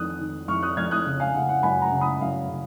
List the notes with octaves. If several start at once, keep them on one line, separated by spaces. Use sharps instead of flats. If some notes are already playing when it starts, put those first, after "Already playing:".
Already playing: F2 D#3 D#6 F#6
D#3
F2 C#6 F6
D#6 F#6
F2 F6 G#6
D#6 F#6
C#3
F5 G#5
C#3 F#5
F#5
F#2 G#5 B5
F#5 A#5
C#3
B5 D#6
F#2 F5
C#3